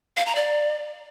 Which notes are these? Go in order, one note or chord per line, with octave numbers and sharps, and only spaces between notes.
F5
A#5
D5